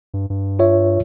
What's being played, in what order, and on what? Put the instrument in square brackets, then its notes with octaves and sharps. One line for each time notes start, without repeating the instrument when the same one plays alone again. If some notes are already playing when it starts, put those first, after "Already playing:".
[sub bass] G2
G2
[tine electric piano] F4 C#5 E5